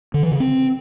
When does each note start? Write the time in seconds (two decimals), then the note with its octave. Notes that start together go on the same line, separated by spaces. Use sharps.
0.14 D3
0.23 E3
0.31 C#3
0.40 C4